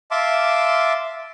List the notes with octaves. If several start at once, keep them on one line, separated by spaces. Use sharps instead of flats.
E5 F5 A5 C6 D6